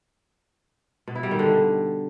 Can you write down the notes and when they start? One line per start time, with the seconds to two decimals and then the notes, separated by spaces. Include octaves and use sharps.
1.08 B2
1.15 E4
1.23 G3
1.31 D#3
1.39 D3